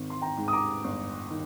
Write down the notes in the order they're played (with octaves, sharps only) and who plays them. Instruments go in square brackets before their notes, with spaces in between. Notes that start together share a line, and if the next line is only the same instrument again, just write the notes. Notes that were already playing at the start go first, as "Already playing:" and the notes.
Already playing: [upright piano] G#1 D#3
[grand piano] C6
G5 A#5
[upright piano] G#2
[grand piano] D#6
A#5 D6
[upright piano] G1
D#3